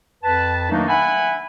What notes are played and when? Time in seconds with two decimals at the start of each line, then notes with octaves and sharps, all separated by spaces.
0.24 F2 B4 A5
0.70 D#3 F#3 A3 A#3 D4 D#4
0.88 E5 F#5 G#5 B5